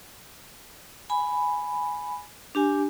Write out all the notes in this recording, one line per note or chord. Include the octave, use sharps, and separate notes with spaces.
G#5 B5
D4 G4 G#5